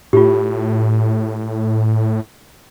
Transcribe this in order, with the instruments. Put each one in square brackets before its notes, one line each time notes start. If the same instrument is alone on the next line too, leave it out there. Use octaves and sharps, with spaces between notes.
[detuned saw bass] A2 [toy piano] F4 G4